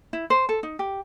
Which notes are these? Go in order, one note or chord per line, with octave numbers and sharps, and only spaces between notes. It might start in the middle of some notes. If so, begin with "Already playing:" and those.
E4
C5
A4
D#4
G4